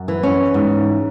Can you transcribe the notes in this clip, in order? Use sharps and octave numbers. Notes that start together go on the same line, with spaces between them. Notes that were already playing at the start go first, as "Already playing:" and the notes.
Already playing: F#2
E3
C#4
G#2